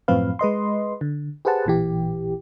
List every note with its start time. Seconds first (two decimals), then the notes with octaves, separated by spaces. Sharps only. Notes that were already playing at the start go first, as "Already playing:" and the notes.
0.08 F#2 A2 F3 C4 B4 F5
0.39 G#3 B4 D#5 C6
1.01 D3
1.45 G4 G#4 B4 C5 F#5 A5
1.65 A1 A#2 E3 G4